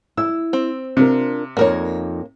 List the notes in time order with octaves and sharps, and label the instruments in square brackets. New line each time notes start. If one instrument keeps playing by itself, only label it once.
[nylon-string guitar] E4 E5 [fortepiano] E6
[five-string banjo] C4
[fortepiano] C3 [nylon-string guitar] D4 F4 A#4
[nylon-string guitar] F2 D#4 D5 [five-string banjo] A#3 A#4 C#5